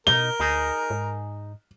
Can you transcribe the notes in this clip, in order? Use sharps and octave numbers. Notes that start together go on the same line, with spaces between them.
B2 D#4 A#4 G7
D2 D#4 G#4
G#2